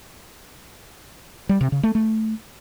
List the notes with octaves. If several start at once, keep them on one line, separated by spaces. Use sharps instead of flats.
G3
C3
C#3
A3
A3